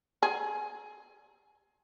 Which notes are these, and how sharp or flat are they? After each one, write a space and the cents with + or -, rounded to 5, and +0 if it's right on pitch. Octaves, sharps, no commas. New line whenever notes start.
G#4 +25